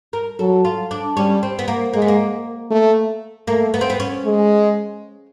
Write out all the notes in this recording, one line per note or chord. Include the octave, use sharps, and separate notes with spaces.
A#4
F#3 A4
F4
D4
G3 C#4
C4
B3
A#3
G#3 A#3
B3
A#3
A3
A3 A#3
B3
C4
B3
C#4
G#3